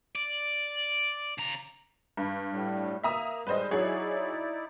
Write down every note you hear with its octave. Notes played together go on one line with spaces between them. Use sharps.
D5
C#3 A#5
G2
A2 G3
A#3 E5 A#5 D#6
G3 G#3 B4 C5 D#5
F#3 D#4 E4 G#4 C#5 D5